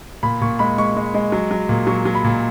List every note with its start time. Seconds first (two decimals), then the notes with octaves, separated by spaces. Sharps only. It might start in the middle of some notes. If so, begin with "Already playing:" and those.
0.23 A#2 B5
0.41 A#2 C#6
0.59 G#3 B5
0.78 G#3 C#6
0.96 G#3
1.14 G#3
1.32 F#3
1.51 F#3
1.69 A#2
1.87 F#3 C#6
2.05 F#3
2.15 B5
2.24 A#2